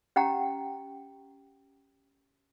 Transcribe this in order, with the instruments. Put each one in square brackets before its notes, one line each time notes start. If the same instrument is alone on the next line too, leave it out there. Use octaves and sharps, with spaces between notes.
[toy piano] C#4 G4 F#5 G5 A#5